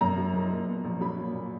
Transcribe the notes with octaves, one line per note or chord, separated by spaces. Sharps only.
F#2 A#5
F#3
F#1
A#2
B3
A#1
F#3 B5
A#2
A#2